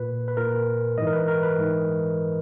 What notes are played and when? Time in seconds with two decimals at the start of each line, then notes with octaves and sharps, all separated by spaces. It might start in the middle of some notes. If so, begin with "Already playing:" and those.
Already playing: A#2 B4
0.28 B4
0.37 A#2 A#4
0.98 G#2 E3 D#5
1.07 A#4
1.13 B4
1.28 A#4
1.43 B4
1.58 G#2 E3